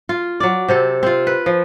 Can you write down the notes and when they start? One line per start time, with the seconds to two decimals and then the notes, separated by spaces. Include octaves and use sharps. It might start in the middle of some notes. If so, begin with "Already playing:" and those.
0.09 F4
0.40 F#3 D5
0.68 C3 C4 A4
1.03 C4 F4
1.27 B4
1.46 F3